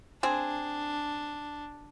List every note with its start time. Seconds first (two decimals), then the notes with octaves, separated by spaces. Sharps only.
0.23 C4 D4 G#4